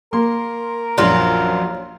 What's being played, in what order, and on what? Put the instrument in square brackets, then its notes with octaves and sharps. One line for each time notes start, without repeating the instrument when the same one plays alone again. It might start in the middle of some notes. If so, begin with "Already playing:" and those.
[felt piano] A#3 [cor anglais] A#4 [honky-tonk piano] C6
[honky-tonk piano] A#1 F#2 D4 [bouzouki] F#3 F4